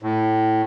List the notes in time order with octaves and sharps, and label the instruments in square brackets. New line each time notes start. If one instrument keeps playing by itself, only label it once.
[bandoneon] A2